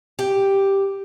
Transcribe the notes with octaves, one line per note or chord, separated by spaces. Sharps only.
G4